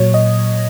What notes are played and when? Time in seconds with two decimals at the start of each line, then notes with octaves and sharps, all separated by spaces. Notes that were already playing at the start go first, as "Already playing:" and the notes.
Already playing: A#2 F#3 C#5
0.14 D#5